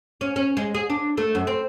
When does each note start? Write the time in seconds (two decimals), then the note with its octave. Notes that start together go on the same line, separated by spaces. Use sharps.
0.21 C#4
0.36 C#4
0.57 G#3
0.74 G#4
0.90 D4
1.17 A3
1.35 F#2
1.47 C4